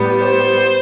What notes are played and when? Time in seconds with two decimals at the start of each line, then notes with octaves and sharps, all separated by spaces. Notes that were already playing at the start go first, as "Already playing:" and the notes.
Already playing: A2 G3 B3
0.23 C5